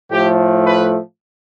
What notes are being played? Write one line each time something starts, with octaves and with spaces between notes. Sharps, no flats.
A2 F3 A3 G4
B4